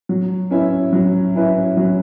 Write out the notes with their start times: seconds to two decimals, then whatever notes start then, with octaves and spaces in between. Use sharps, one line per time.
0.09 F#3
0.51 C#4 E4 B4 E5
0.93 F#3
1.35 C#4 E4 B4 E5
1.77 F#3